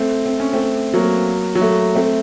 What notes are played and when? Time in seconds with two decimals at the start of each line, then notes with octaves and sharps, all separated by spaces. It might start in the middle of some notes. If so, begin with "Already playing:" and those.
Already playing: A3 C4
0.26 C4
0.40 C#4
0.53 A3 C4
0.94 F#3 A#3
1.55 F#3
1.61 A3
1.95 A3 C4